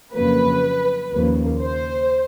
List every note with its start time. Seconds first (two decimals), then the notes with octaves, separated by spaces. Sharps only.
0.13 F2 C#3 F#3 A#3 B4
1.12 D#2 C#3 F3 A#3
1.61 C5